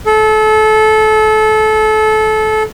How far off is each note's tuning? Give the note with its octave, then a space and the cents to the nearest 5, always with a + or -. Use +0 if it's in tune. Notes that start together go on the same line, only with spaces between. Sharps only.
A4 -25